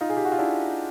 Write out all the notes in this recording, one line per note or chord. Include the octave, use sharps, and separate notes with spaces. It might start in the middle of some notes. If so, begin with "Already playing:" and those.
D#4 F4
G#4
G4
F#4
F4
D4 E4